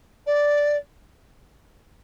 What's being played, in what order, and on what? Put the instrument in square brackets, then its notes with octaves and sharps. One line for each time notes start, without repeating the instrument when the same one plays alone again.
[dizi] D5